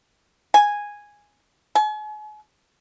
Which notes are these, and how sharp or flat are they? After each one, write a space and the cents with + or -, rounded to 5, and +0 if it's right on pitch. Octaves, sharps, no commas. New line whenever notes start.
G#5 -5
G#5 +40